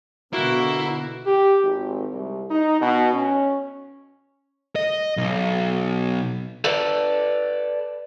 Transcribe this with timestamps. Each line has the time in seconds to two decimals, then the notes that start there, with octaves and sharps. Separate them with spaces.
0.33 B2 D3 A#3 E4 F#4
1.26 G4
1.63 G#1
2.12 C2
2.50 D#4
2.80 B2
3.14 C#4
4.76 D#5
5.17 B1
6.64 A4 B4 D5